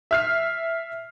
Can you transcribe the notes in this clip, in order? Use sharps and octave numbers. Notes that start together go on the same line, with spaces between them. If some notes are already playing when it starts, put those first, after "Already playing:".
E5 F6 C7